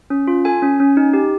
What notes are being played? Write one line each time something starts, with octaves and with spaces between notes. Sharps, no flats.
C#4
F4
A4 G#5
C#4
C#4
D#4
G4